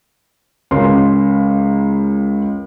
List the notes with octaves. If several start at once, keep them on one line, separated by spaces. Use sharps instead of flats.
C#2 C#4 A#4 C6